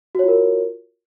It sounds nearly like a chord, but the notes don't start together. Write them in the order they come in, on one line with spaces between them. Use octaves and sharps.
F#4 C#5 F4 A#4